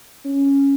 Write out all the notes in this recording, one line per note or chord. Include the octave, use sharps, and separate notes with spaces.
C#4